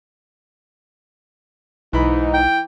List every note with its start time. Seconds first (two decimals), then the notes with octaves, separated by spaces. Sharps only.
1.93 B1 G#2 E3 D#4 B5
2.34 G5